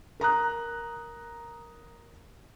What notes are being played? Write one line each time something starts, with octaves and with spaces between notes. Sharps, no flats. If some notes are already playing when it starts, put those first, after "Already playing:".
A#4 A#5 D#6 F#6